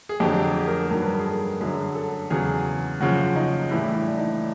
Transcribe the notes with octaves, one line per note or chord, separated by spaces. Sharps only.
G#4
F2 D3 F#3 G4
G4
G#4
A#4
G2 D#3 F#3 A#4
B4
A#4
G#4
A4
F#2 D3 F#3 G#4
A4
E2 C#3 F#3 G#4
F#2 C#3 F3 F#4
D#4
A2 E3 G3 E4
D4
D4
D#4